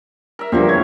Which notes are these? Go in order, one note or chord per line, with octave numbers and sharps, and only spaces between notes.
A#4 E5
E2 D3 F3 G3 A#3 C4
A2 C#5 G#6